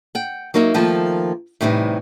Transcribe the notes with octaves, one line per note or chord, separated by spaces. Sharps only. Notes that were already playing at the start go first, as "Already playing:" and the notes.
F#5 G5
F#3 A#3 D#4 A#4 E5
D#3 F3 A3 A#3
A2 C3 E3 G3 B3 D#4